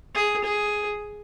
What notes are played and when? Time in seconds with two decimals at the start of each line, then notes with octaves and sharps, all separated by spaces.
0.15 G#4
0.44 G#4